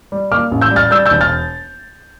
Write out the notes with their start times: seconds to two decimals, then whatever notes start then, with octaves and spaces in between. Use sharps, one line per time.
0.12 G3
0.31 A#3 D6 F6
0.51 A1
0.61 E6 G6
0.71 G3
0.76 F6 A6
0.91 G3 E6 G6
1.06 E6 G6
1.11 E1
1.21 F6 A6